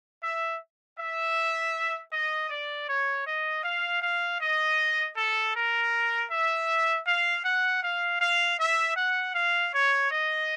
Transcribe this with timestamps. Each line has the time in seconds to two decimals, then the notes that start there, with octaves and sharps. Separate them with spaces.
0.23 E5
0.98 E5
2.12 D#5
2.50 D5
2.89 C#5
3.26 D#5
3.64 F5
4.02 F5
4.40 D#5
5.16 A4
5.55 A#4
6.31 E5
7.06 F5
7.44 F#5
7.82 F5
8.20 F5
8.58 E5
8.96 F#5
9.34 F5
9.73 C#5
10.11 D#5